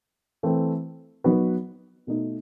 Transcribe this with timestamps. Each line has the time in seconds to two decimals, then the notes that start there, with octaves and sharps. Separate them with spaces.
0.43 E3 A3 C4
1.24 F#3 B3 D#4 F#4 B4
2.07 B2 A3 D#4